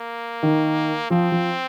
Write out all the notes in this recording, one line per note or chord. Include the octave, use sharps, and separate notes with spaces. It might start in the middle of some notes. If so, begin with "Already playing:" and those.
Already playing: A#3
D#3
F3 C4
F3